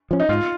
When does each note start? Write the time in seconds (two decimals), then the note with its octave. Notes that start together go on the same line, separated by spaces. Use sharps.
0.11 F3 C#4
0.20 D#4
0.29 G#2 F4